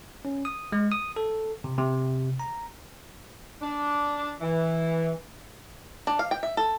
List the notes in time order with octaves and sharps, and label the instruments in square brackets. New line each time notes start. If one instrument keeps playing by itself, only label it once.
[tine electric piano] C#4
D#6
G#3
D#6
A4
C3
C3
A#5
[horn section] D4
E3
[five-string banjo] D4
F5
G5
E5
A4